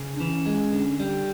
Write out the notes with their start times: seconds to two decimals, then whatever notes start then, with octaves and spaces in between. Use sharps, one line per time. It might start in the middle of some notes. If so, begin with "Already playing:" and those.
Already playing: C#3
0.14 D4
0.20 E3 C#4
0.46 G#3
0.72 D3
1.00 G3